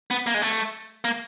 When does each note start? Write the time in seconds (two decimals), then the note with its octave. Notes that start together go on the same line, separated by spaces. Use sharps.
0.11 B3
0.27 A#3
0.34 G#3
0.42 A3
1.05 A#3